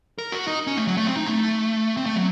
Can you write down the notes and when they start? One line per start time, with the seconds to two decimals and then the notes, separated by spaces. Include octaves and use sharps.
0.18 A#4
0.32 F#4
0.48 D#4
0.67 C#4
0.77 A3
0.87 F#3
0.97 A3
1.07 C4
1.17 D#4
1.26 A3
1.97 C4
2.06 A3
2.16 F#3